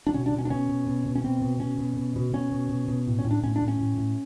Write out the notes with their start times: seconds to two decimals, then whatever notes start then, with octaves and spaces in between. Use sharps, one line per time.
0.07 D4
0.14 B2 C#4
0.26 D4
0.32 B2
0.39 C#4
0.45 D4
0.50 B2 C#4
0.69 B2
0.87 B2
1.06 B2
1.15 C#4
1.24 B2 C4
1.42 B2
1.60 B2 C#4
1.79 B2
1.97 B2
2.16 B2
2.33 B2 C#4
2.52 B2
2.70 B2
2.88 B2
3.07 A2
3.19 C#4
3.24 A2
3.31 D4
3.43 A2 C#4
3.56 D4
3.62 A2
3.68 C#4
3.80 A2
3.97 A2